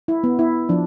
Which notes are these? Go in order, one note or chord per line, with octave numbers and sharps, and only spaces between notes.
E4
B3
E4
F3 D4